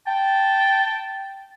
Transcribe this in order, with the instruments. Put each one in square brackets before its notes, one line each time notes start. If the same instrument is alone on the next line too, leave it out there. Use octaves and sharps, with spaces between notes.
[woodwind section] G5 A5